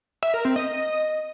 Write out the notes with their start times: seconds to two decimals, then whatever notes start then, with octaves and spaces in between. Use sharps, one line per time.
0.23 E5
0.34 A#4
0.45 C4
0.56 D#5